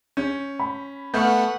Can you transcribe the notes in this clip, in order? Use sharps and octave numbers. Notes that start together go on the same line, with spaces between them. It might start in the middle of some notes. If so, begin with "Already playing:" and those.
C#4 G6
B5
A3 B3 F#5 C#6 F6 G6